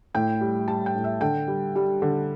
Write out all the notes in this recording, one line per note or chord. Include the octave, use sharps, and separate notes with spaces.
A2 G5
G3
G3 A5
G5
A2
E5
D3 G5
G3
G3
D3